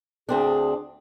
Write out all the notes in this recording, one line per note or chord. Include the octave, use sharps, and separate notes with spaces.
D2 C4 D4 G#4